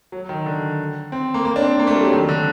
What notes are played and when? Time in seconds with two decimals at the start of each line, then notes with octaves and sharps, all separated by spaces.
0.12 F#3
0.29 D#3
0.46 D3
1.12 C4
1.34 A#3
1.45 A#3
1.56 D4
1.62 C4
1.79 A#3
1.87 A3
1.96 G3
2.04 F#3
2.12 D#3
2.29 D3